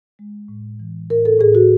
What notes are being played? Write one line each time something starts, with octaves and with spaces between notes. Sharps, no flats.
G#3
A2
E3
A2 A#4
A4
A2 G#4
F#4